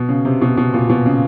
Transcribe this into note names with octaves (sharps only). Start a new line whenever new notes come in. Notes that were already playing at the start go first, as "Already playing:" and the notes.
Already playing: B2
C#3
C3
B2
B2
A#2
B2
C#3